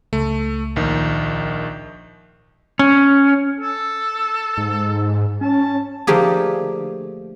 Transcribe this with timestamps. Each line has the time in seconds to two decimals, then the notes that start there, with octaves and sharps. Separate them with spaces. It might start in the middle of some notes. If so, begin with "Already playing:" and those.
0.13 C#2 A3
0.76 A#1 D#3
2.79 C#4
3.60 A4
4.57 G#2
5.41 C#4 A5
6.07 D3 F3 A3 A#3 G4 G#4